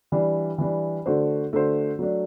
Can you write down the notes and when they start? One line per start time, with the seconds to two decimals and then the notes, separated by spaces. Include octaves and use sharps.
0.12 E3 G3 D4
0.58 E3 G3 D4
1.06 D3 A3 D4 F#4 C5
1.53 D3 A3 D4 F#4 C5
1.99 F#3 A3 D4